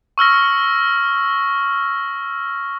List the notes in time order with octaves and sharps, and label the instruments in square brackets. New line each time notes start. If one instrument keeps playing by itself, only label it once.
[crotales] C#6 E6 F6 A#6